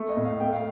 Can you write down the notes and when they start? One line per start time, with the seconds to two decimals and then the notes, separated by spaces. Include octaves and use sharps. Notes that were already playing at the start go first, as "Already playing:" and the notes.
Already playing: A3
0.09 D#5
0.17 A2
0.25 F5
0.40 A3 G5
0.53 F5